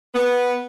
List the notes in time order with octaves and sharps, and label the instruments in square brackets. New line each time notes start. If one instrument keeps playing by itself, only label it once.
[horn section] B3